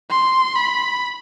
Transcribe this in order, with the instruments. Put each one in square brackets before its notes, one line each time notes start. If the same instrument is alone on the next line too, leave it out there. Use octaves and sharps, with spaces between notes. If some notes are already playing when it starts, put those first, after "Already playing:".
[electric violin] C6
B5